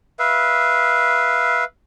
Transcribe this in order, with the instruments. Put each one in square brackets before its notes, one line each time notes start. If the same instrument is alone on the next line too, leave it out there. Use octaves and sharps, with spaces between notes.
[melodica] B4 E5 F5